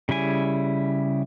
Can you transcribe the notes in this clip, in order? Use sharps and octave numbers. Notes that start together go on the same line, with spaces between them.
C#3 G3 E4 G#5